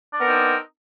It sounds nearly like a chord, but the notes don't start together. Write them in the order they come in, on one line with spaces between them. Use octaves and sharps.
D4 A#4 B3 C4 D#4